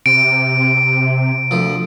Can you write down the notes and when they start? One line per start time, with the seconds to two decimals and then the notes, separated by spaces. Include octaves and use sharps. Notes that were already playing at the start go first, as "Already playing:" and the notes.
0.06 C3 D7
1.51 D2 F3